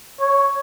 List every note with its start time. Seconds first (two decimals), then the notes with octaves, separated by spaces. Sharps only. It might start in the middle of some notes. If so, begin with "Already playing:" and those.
0.20 C#5